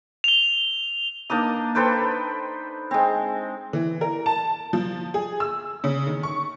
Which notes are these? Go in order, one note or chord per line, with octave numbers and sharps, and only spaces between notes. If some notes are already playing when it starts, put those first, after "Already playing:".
F7 G7
A#3 D4 D#4 D#6
A4 B4 C5 G5
G#3 C4
E3
A#4
A5
F3
G#4
E6
C#3
D#3
C#6